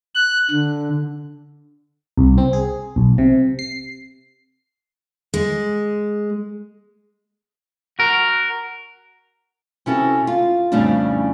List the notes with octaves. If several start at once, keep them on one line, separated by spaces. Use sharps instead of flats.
F#6
D3
C2
C4
G#4
B1
C3
C7
G#3
F#4 A#4
C3 C#4 E4 F#4 A4
F4
F2 A2 C#3 G3 C#4 D4